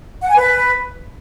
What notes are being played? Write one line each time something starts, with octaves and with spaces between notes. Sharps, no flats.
F#5
G#5
B4